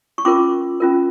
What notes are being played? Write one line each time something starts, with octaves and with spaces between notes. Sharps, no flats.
C#6
C#4 F4 A#4 C6 D6
C#4 F4 A#4